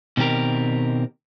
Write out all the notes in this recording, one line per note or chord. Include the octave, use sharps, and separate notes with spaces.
B2 D#3 C4 G4 A#4